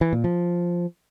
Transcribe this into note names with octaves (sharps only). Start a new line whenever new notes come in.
E3
A#2
F3